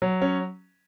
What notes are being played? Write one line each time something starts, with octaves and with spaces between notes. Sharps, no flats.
F#3
C#4